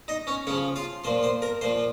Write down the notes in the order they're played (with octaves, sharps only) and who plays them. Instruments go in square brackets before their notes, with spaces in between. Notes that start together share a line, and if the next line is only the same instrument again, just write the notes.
[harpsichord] D#4 D#5
C#4 C#5
C#3 F3 C#4 C#5
F4 F5
A#2 F3 C5 C6
C5 C6
A#4 A#5
A#2 F3 C5 C6